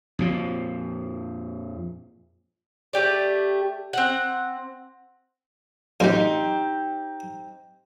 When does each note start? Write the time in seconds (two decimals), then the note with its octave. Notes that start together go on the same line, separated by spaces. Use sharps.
0.19 F2 A#2 F3
2.93 A3 G4 D5
3.93 C4 F#5
6.00 A1 F#2 C4 D#4 G4 A#4